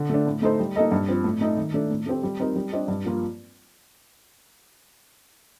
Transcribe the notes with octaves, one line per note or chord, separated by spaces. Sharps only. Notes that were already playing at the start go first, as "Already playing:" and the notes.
Already playing: D3
A3 D4
A2
A3 D#4 A4 C5
G3
A#3 D#4 A4 D#5
G2
F3 C4
A2
A3 D#4 A4 D#5
D#3
A3 D4
A2
A3 C4 G4
G3
C4 D#4 G4 A#4
G3
D4 G4 C5 D#5
G2
F3 A#3 F4